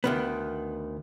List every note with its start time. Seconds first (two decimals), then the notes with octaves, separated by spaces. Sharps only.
0.04 D2 D#3 B3